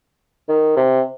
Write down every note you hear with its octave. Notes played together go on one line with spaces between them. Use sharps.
D#3
C3